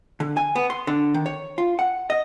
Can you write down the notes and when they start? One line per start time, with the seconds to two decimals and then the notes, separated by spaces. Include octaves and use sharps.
0.20 D3
0.37 G#5
0.55 B3
0.70 C6
0.87 D3
1.14 D#3
1.26 C#5
1.58 F4
1.79 F#5
2.10 D#5